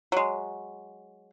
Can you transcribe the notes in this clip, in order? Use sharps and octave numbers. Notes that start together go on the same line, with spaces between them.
F#3 G#3